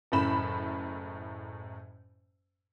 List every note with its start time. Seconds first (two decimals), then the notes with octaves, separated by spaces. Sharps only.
0.12 F#1 F#2 A2 B5 E7